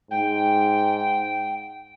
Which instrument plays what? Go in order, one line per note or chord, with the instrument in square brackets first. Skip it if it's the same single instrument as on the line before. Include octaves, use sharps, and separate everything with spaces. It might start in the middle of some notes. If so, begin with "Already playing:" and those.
[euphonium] G#2 [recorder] G5